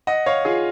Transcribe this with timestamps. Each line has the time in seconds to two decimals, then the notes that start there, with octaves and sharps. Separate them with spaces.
0.07 D#5 F#5
0.26 C#5 F5
0.45 F4 G#4